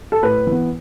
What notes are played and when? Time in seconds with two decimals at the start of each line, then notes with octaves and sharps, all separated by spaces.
0.12 A4
0.23 A2 B4
0.47 E3 B3